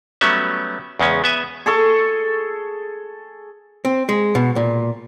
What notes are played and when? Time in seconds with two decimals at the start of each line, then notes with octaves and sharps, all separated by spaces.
0.21 F#3 G3 A3 B3 C#4 E5
0.99 E2 C#3 G#3 C#4
1.24 B3 E5 G#5
1.66 G#4 A4 C#6
3.85 C4
4.09 G#3
4.35 B2
4.56 A#2